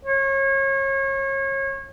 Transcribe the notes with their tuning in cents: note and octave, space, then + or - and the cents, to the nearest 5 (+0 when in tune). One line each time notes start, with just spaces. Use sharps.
C#5 -30